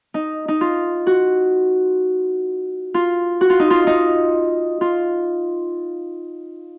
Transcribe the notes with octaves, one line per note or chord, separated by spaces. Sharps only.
D#4
D#4
F4
F#4
F4
F#4
F4
D#4
F4
D#4
F4